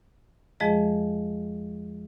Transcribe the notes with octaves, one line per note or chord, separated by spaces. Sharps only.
F2 F3 G#3 G#4 D#5